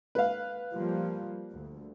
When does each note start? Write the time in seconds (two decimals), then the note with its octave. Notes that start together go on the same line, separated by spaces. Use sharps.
0.15 B4 F5
0.72 F3 G3 A#3
1.51 D2